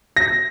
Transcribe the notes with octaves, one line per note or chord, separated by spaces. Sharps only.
A#6